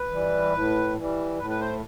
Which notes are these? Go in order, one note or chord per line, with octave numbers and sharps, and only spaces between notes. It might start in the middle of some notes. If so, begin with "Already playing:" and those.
Already playing: B4
E3 G3
A2
E3 G3
A2 B4
B4
C5